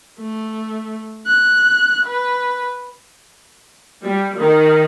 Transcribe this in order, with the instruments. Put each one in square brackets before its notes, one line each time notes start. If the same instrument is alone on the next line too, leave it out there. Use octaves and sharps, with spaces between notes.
[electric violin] A3
F#6
B4
[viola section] G3
D#3